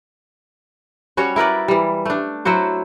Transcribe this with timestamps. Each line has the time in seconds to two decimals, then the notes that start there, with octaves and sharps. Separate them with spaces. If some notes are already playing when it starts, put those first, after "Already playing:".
1.17 G3 C#4 F#4 C#5
1.36 E4 A#4 B4 D5
1.68 E3 G3
2.05 A3 D4
2.45 F#3 E4 F#4 C5